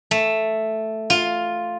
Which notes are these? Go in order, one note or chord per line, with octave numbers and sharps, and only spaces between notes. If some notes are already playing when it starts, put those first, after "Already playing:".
A3
F4